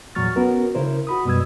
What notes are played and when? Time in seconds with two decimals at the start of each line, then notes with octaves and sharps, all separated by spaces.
0.15 E2 A#2 F#3 C#6 F6 A6
0.36 B3 C#4 F#4 A#4
0.75 C#3 E4 A#4 C5
1.07 F#4 B5 D#6
1.25 F#2 B2 G3 D#6 E6 G#6